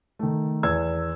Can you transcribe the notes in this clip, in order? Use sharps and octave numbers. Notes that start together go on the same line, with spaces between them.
D#3 A3
E2 E6 G#6